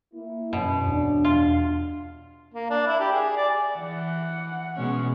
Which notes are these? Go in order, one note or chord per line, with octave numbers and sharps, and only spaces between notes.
A#3 E4
F#2 B2 C#4
E2 D4
F4
A#3
D4
E4
G4
G#4
D5
E3 F#5
B2 G#3 C#4